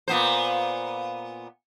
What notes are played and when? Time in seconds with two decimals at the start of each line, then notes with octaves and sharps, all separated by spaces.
0.08 A#2 B3 C5